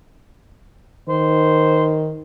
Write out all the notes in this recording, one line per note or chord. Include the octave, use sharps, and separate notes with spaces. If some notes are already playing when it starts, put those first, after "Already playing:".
D#3 C5